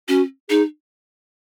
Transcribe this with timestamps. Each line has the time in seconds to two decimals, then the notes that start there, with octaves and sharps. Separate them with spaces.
0.08 C#4 F#4
0.49 D#4 G#4